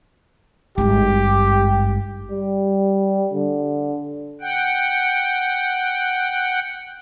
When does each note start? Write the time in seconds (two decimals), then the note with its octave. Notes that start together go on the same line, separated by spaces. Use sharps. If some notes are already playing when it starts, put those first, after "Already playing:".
0.78 G#1 G2 G4
2.31 G3
3.34 D3
4.41 F#5 G5